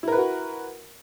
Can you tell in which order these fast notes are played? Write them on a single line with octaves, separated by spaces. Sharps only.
E4 A#4 B4 F#4